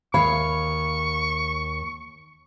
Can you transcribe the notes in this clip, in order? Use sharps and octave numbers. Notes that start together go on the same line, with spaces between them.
D#2 C#5 F5 B5 C#6